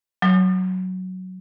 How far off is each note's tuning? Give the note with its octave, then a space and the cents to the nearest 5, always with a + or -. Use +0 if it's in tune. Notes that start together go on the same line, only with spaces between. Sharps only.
F#3 +0 D#6 -40